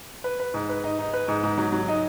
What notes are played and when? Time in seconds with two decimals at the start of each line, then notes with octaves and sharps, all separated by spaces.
0.24 B4
0.40 B4
0.54 G#2
0.69 B4
0.84 D#4
0.99 D#4
1.13 B4
1.28 G#2
1.43 G#2
1.58 F#3
1.72 F#3
1.88 D#4